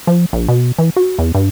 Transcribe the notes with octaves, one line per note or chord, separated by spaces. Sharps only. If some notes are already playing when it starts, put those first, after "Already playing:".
F3
A#1
B2
E3
F#4
E2
G2